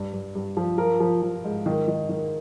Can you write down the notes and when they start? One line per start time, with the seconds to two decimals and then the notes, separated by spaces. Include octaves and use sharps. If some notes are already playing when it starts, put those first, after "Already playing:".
Already playing: G2
0.13 G2
0.35 G2
0.57 F3
0.78 F3 A#4
1.00 F3
1.22 F3
1.44 G#2
1.66 D#3
1.88 D#3
2.09 D#3